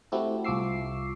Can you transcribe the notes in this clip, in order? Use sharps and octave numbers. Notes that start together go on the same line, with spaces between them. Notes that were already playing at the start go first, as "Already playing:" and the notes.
A3 C4 E4 F#4 G4 A4
C2 F4 C#6 D6 E6 C7